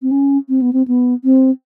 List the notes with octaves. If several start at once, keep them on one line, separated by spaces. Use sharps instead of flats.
C4
C#4
C4
B3
C4
B3
C4